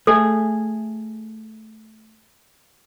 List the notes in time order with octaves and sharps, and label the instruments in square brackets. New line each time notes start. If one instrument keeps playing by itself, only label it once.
[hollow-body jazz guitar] A3 G#4 [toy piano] A4